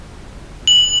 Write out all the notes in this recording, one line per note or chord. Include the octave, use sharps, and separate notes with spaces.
F#7